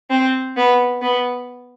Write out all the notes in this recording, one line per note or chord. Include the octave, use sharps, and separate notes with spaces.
C4
B3
B3